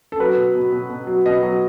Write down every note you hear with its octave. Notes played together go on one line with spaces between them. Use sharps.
A4
F#3 B4
B2
B2
B2
B2
F#3
B2 D#5
F#3